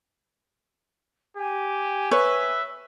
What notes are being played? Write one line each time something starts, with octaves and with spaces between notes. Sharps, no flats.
G4 G#5
B4 C#5 E5